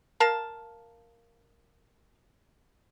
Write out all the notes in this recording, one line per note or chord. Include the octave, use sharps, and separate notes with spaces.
A#4 F5 A5